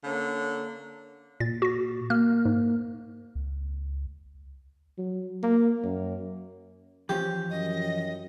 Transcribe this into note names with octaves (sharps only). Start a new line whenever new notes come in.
D3 A#3 C#4
A#2 A6
F#4 A#6
A#3 F6
G#2
C#2
F#3
A#3
F#2
E3 F3 C#4 G4
F#2 D#5